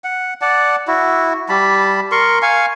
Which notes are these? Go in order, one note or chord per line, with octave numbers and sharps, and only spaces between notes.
F#5
D5 F#5 A5
E4 F#4
G3 A5 B5
A#4 C6 C#6
F5 G#5 C#6